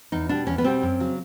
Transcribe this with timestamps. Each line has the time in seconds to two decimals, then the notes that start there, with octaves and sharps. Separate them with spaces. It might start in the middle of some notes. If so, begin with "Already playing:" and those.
0.12 E2 D#4
0.29 B2 G3 D4
0.47 E2 C#4
0.58 B3
0.64 B2 G3 C4
0.82 F#2
1.00 C#3 F#3